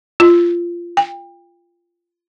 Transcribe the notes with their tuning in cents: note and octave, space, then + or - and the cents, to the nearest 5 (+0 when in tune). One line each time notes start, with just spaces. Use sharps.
F4 -15
G5 +30